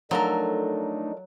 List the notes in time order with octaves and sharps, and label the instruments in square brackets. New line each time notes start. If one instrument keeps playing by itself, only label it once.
[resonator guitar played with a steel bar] F3 A4 A#4 [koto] F#3 [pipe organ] A3 D4 D#4